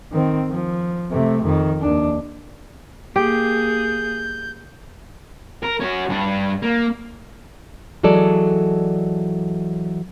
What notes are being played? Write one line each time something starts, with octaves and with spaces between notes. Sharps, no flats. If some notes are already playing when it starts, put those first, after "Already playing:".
D#3 C4
F3
C3 A3
F2 D#3
D#2 D4
A#3 G4 G#4 G6
A#4
C#4 F#4
G2 D4
A#3
E3 F#3 G#3 A4 D5